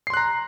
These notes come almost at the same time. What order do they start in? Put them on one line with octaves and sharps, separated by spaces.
C7 C6 F#6 A#5